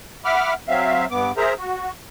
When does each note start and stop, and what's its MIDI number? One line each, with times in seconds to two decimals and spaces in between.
0.25 0.54 76
0.25 0.54 78
0.25 0.54 83
0.25 0.54 86
0.25 0.54 89
0.68 1.06 54
0.68 1.06 60
0.68 1.06 76
0.68 1.06 77
1.11 1.32 43
1.11 1.32 59
1.11 1.32 86
1.37 1.54 68
1.37 1.54 70
1.37 1.54 72
1.37 1.54 76
1.37 1.54 82
1.58 1.91 66